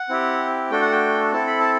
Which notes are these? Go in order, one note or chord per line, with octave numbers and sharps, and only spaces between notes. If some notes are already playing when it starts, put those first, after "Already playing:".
Already playing: F#5
C4 E4 G4
A3 D4 F#4 A4 G5
F#5
G5
C4 E4 A4 A5
B5
A5